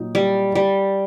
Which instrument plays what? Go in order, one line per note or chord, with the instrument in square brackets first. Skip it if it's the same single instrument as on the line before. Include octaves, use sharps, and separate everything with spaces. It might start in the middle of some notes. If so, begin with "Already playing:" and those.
Already playing: [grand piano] A#2 F#3 D#4
[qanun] G3
G3